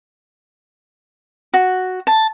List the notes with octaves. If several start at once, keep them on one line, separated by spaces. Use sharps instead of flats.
F#4
A5